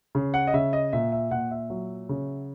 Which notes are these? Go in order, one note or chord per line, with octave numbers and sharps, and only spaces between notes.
C#3
F#5
D#5
C#3 E5
D#5
A#2 E5
E5
A#2 F#5
E5
F#3
C#3